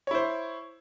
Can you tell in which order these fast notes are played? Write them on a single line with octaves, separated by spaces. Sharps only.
C#5 E4 C5